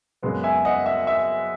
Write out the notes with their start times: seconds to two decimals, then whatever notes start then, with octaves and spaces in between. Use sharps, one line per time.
0.23 F#2 C#3 G#3 B3
0.44 E5 G#5
0.65 D#5 F#5
0.86 E5
1.07 E5